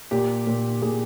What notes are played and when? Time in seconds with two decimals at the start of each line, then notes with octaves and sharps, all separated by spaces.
0.11 A#2 G4
0.47 A#2
0.82 A#2 G#4